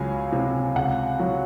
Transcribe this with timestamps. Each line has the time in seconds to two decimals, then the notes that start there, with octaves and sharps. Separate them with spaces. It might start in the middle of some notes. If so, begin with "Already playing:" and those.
Already playing: C#2 F#3 F5 G#5
0.32 C3
0.76 C#2 F#5
1.19 F#3